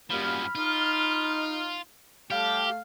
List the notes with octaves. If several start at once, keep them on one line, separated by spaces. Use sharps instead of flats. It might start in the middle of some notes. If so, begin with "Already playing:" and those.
F#2 F3 G3 A#3 B5 F6
D#4 F4
G3 A3 G4 F5 G5 A5